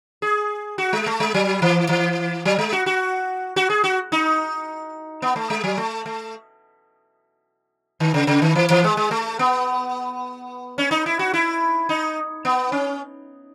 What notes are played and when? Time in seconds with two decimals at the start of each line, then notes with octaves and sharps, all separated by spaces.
0.22 G#4
0.78 F#4
0.93 G#3
1.06 A3
1.20 G#3
1.34 F#3
1.62 E3
1.89 E3
2.45 F#3
2.59 G#3
2.72 F#4
2.86 F#4
3.56 F#4
3.70 G#4
3.84 F#4
4.12 D#4
5.22 B3
5.36 A3
5.50 G#3
5.64 F#3
5.77 A3
6.06 A3
8.00 D#3
8.14 C#3
8.27 C#3
8.42 D#3
8.55 E3
8.70 E3
8.84 G#3
8.97 G#3
9.11 A3
9.39 B3
10.78 C#4
10.91 D#4
11.06 E4
11.19 F#4
11.33 E4
11.89 D#4
12.45 B3
12.72 C#4